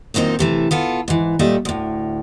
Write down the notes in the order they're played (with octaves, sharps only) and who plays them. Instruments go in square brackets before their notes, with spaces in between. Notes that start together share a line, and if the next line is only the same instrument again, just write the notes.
[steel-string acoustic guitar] F#2 A#2 D#3 C4 D#4
C3 E3 A3
B3 F4 A4
G#2 E3
A#2 G3 A3 D#5 E5
D2 A2